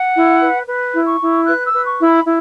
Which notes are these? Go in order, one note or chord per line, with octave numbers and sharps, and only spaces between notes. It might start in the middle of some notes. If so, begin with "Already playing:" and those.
Already playing: F#5
E4
B4
B4
E4
C#6
E4
B4 F#6
E6
B4
C#6
E4
B5
E4